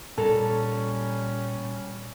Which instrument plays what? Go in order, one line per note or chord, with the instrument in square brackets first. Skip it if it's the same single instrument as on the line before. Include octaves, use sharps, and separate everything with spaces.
[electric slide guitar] A#2 A#5 [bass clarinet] G3 [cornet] C#4 [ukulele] A4